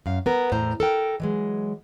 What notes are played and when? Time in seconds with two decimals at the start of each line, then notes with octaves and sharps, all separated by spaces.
0.06 F#2 F5
0.26 B3 A#4
0.52 E2 A2 C5 A#5
0.80 A4 A#4 G5
1.20 E3 F#3 G#3